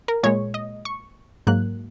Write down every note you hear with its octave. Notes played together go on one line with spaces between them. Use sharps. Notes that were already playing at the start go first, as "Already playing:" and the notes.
A#4
A#2 G#3 C#5
D#5
C#6
G#2 F#3 A#3 F#6